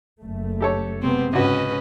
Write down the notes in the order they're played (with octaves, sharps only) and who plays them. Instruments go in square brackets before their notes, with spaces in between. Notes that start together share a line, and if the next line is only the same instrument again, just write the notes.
[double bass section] F#1 A3
[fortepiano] G4 A4 C#5
[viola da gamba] C3 G#3 C4 [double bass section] B3
[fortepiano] C#2 F#4 [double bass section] G#2 [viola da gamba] C#4 B4 D#5